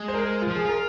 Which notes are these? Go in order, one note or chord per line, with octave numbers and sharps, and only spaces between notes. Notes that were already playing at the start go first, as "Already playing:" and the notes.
Already playing: G#3 G#4
C5
A#4
F4
F3
G#4
F4 A#4